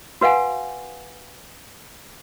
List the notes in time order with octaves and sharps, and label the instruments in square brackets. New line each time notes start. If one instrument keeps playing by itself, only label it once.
[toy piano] F#4 B4 F5 F#5 G#5